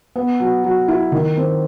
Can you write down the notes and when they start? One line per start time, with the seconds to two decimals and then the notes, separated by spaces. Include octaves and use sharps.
0.16 B3
0.40 F#3
0.64 F#3
0.88 E4
1.12 D#3
1.37 C4